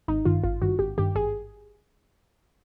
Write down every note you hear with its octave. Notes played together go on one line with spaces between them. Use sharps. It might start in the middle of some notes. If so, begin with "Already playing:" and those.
G#1 D#4
G2 D#3 F4
G#1 F4
G2 D#3 F#4
G#1 G4
G2 D#3 G4
G#1 G#4